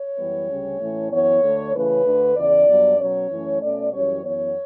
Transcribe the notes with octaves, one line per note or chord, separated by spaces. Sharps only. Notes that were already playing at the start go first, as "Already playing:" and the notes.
Already playing: C#5
F#2 E3 G3 B3
D2 C#3 G3 C#4
A2 E3 A3 C#4
F#2 E3 B3 C#5
D2 D3 A3
C#3 E3 A3 C#4 B4
D2 D3 A3
E2 C#3 E3 D5
G2 F#3 B3
B2 F#3 C#4 C#5
F#2 E3 A3 C#4
B2 A3 C#4 D5
F#2 E3 G3 C#4 C#5
F#2 E3 B3 C#5